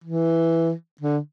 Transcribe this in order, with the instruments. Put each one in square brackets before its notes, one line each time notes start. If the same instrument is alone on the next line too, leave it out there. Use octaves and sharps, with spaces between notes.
[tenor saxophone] E3
D3